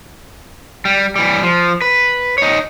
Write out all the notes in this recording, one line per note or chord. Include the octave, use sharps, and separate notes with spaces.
G3
E3 G3
F3
B4
D#4 C#5